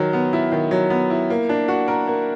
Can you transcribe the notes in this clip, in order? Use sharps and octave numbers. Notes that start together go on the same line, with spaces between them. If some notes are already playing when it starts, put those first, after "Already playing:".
Already playing: D#3 F#3
B3
E4
D#3
F#3
B3
E4
A#3
D4
F#4
A#4
A#3